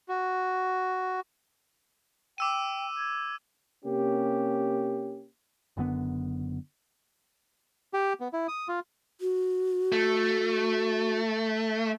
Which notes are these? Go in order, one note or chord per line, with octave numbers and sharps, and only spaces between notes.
F#4
G5 D6 E6 D#7
G#6
C3 A#3 C#4 G4
F#1 F#2 D3 B3
G4
B3
E4
D#6
F4
F#4
A3